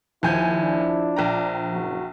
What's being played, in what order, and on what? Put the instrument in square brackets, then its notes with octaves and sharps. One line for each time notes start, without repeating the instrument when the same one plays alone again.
[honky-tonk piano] D#2 G#5 G6 [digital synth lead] F3 [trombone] E4
[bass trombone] D4
[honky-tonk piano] A#1 G5 A#5
[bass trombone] F#1 [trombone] F#4